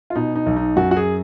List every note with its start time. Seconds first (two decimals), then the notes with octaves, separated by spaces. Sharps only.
0.10 F4
0.15 B2 D#4
0.35 D#4
0.46 B1
0.56 D#4
0.76 F#2 F#4
0.91 F#4
0.97 G#4